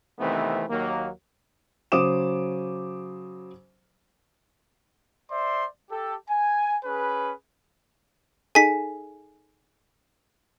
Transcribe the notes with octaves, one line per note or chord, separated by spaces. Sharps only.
C3 D#3 E3 A3 B3 C4
D#2 D#3 F#3 A#3
C#3 F#3 C5 D6 D#6 E7
C5 D5 E5 C6
G4 A4
G#5
C#4 G#4 B4
D#4 G#4 A4 G#5 B6